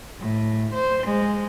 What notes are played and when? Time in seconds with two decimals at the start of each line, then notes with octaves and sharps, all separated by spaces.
0.19 A2
0.74 C5
1.07 G#3